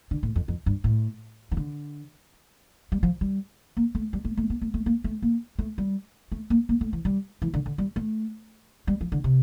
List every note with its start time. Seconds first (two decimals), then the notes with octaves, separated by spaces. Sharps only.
0.11 D3
0.23 A2
0.36 F2
0.48 F2
0.66 G2
0.84 A2
1.51 E3
1.57 D3
2.92 G3
3.03 F3
3.21 G3
3.77 A#3
3.95 A3
4.13 G3
4.25 A3
4.37 A3
4.50 A#3
4.62 A3
4.74 A3
4.86 A#3
5.04 A3
5.22 A#3
5.58 A3
5.78 G3
6.32 A3
6.50 A#3
6.69 A#3
6.81 A3
6.93 E3
7.05 G3
7.42 E3
7.54 D3
7.66 D3
7.78 G3
7.96 A3
8.87 G3
9.01 F3
9.12 D3
9.24 C3